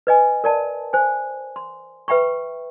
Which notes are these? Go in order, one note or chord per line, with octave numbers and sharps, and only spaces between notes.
B4 D#5 G#5
A#4 D5 A5
C5 G#5
C6
B4 E5 G5 B5 C#6